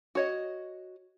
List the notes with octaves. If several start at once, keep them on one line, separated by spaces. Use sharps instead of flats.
F#4 C#5 D#5